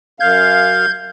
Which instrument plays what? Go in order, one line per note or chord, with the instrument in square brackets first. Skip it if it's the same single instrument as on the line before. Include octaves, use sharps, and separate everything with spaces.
[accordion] F#2 F5 [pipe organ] G6 G#6